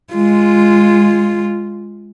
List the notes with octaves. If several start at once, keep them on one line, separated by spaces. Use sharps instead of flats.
G#3 F4